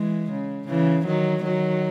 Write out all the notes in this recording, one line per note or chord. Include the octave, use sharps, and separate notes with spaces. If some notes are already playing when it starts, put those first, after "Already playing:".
Already playing: E3 G#3
C#3
C#3 E3
D#3 F#3
D#3 F#3